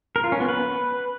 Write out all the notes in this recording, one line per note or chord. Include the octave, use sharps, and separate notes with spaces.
A#4
F4
C#4
B3
B4